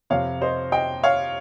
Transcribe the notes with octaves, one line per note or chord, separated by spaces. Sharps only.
F2 C3 F3 C#5 F5
C5 D#5
D#5 G5
C#5 F5